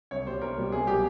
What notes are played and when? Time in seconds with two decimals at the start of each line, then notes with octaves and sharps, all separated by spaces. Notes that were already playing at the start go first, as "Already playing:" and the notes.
0.11 C2 C#5
0.26 B2 G3 C5
0.42 C2 A#4
0.58 B2 G3
0.72 C2 G#4
0.87 B2 F#3 G4